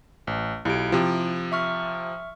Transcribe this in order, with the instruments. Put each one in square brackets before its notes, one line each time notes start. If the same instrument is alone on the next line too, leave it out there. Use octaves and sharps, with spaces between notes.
[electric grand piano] A1
[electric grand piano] B1 [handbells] E4 G4 D7
[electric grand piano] C3 F3
[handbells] E5 C#6 F6